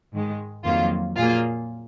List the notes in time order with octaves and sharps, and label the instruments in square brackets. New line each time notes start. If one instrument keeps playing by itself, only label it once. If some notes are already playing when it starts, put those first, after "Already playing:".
[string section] G#2 D#3 G#3
F2 D#3 F#3 A#3 F4
A#2 F#3 A#3 F4 G#4